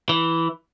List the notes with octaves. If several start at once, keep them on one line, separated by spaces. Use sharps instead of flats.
E3